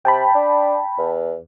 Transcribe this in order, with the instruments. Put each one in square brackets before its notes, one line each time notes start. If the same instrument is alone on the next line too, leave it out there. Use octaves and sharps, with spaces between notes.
[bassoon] C3 [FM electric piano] G5 A5 B5
[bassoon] D4
E2